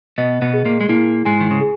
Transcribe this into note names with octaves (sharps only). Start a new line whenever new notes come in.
B2 B3 D#5
B2 B3
G#4
A#2 A#3
G#3
A#2 A#3 E4
G#2 G#3 G#5
D#3
C#3
G#4